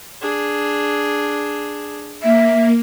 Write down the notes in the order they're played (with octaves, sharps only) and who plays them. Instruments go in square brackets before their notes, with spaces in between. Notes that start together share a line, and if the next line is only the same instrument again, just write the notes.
[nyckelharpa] D4 G#4
[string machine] A#3 [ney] E5